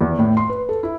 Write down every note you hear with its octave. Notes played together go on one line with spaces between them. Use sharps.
E2
A2
C6
B4
A4
E4